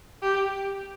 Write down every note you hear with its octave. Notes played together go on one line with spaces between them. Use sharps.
G4